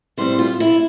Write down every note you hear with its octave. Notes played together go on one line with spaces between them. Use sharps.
A2 G3 C4 C5
F4
E4